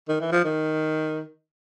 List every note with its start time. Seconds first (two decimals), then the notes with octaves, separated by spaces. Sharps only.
0.09 D#3
0.21 E3
0.32 F3
0.45 D#3